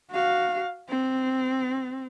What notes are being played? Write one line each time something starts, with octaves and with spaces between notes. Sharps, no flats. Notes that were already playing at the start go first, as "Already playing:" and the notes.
F#4 F5
C4